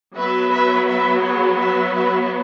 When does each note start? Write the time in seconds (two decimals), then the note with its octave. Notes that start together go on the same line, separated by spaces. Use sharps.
0.15 F#3 B3 B4 E5
0.51 B4 E5
0.87 B4 E5
1.22 G#4 C#5
1.58 B4 E5
1.94 B4 E5